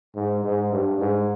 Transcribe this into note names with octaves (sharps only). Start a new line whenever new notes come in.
G#2
G#2
G2
G#2